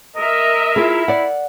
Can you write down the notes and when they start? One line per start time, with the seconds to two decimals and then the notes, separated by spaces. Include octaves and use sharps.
0.17 A#4 D#5 E5
0.76 E4 F4 G#4
1.08 D5 F#5